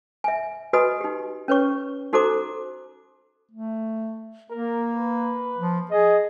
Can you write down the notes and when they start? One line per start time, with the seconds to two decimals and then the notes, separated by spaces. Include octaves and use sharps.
0.24 E5 G#5
0.73 F#4 B4 D#5 G#5 B5 D#6
1.01 D#4 G4
1.48 C#4 B4 C#5 C#6
2.13 D#4 F#4 A4 C5 A#5 D6
3.52 A3
4.50 A#3 A#4
4.94 B4
5.58 F3
5.91 G#4 D#5